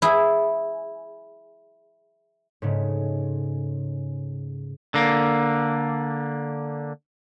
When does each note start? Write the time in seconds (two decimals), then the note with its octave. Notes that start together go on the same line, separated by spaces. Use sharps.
0.02 E4 G#4
2.62 G#2 C#3 G#3 A3
4.94 D3 A#3